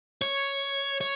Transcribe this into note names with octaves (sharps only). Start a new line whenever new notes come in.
C#5
C#5